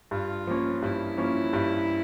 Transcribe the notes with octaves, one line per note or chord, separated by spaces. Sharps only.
G2 F4
F3 A#3 C#4
G2 E4
F3 A#3 C#4
G2